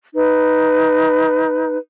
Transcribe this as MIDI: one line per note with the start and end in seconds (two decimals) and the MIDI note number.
0.15 1.76 63
0.15 1.76 71